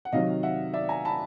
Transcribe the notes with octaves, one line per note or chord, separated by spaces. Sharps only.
F#5
C3 D#3 F#3 D#5 F5
E5 F#5
D5 E5
G#5 A#5
A5 B5